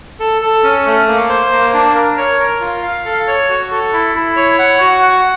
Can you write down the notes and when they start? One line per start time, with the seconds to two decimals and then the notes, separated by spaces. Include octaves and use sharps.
0.20 A4
0.42 A4
0.63 C#4
0.86 A3
1.08 A#3
1.29 C5
1.52 A#3
1.74 D4
1.95 A#4
2.18 C#5
2.39 A#4
2.61 F4
2.83 F5
3.05 A4
3.27 C#5
3.49 F#4
3.71 A4
3.93 E4
4.15 E4
4.36 C#5
4.59 F#5
4.81 F#4
5.03 F#5